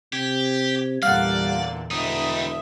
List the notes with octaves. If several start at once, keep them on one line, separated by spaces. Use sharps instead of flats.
C3 G4 G#6
E2 A#2 D3 G3 D5 F5 F#5
E1 D3 G3 D#4 E5 D#6